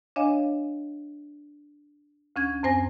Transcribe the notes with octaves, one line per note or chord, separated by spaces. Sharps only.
D4 C#5 D#5 F5 G#5
D2 C#4 G#6
F#2 C4 C5 G#5 A#6